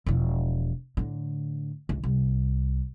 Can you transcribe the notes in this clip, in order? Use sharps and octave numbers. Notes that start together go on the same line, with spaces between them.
E1 F3
A2 D3
C#2
C2